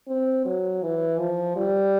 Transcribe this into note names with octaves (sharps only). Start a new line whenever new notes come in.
C4
F#3
E3
F3
G3